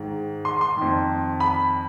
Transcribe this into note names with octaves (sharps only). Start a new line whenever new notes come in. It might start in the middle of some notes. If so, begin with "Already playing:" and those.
Already playing: G#2 D#3
C6
C6
F2 D#3
B5